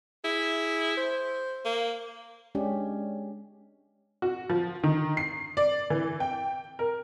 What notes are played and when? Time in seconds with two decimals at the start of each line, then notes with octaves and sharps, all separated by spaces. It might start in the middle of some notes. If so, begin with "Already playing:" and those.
0.25 E4 G#4
0.98 C5
1.65 A#3
2.55 G#3 C#4 D4 G4
4.22 F#4
4.50 F3
4.83 D#3
5.17 C7
5.57 D5
5.90 E3
6.20 G5
6.79 A#4